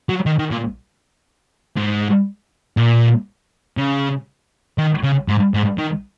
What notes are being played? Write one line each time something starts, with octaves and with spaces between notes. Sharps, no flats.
F#3
D#3
D#3
A#2
G#2
A#2
C#3
D#3
C#3
G#2
G#2
D#3